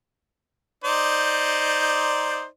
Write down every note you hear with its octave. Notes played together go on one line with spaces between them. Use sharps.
D#4 C5 D5